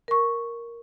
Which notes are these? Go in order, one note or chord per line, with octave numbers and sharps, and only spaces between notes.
A#4 C#6